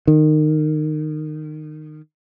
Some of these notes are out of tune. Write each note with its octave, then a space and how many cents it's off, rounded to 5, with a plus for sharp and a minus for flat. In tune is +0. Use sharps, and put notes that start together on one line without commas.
D#3 -20